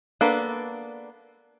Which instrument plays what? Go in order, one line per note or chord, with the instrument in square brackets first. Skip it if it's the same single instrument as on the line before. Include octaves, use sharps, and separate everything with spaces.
[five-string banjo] A#3 B3 D4 A4 B4